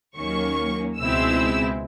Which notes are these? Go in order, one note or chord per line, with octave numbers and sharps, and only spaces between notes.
D#2 D#3 F#3 A#3 C#4 C#6
C#2 B2 G#3 C4 E4 E6